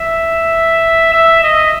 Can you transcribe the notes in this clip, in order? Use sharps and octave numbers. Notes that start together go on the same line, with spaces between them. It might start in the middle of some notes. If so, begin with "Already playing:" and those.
Already playing: E5
E5
D#5